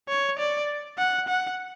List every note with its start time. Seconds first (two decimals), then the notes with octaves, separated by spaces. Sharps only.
0.09 C#5
0.39 D5
0.98 F#5
1.28 F#5